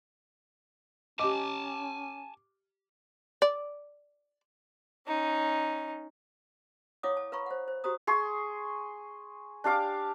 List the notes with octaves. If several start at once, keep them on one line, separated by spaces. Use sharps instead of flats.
C#4 G4 D#5 G#5 A5 D6
D5
C#4 D#4
E4 C#5 F5 F#5 D6 D#6
A5
B4 F5 A#5 B5 C#6
C5 F#5
C5
F#4 G4 C5 A#5 D#6
G#4 C6 C#6
D4 G4 F5 D6